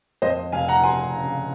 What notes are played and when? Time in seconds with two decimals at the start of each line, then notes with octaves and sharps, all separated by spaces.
0.22 F2 C5 D#5
0.52 F1 F5 G#5
0.68 F#5 A#5
0.83 F1 G#5 C6
1.15 C#3